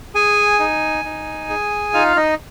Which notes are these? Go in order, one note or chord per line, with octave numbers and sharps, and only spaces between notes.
G#4 G#5
D#4
D#4
G#4
D#4 F4 F5
D#4 D#5